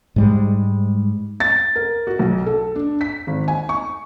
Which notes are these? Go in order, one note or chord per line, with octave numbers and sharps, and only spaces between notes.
G#2 G3 G#3
A6
A#4
F#4
B1
A4
D4
B6
G#1
G#5
C#6